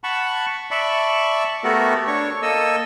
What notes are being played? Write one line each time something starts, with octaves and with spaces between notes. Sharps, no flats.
F#5 A5 B5 C#6
D5 E5 A5 B5 C#6
A3 B3 F#4 G4 A4 A#4
D4 C#5 C#6
A#3 A4 D#5 E6